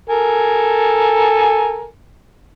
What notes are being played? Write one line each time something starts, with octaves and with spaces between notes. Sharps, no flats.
A4 A#4 G#5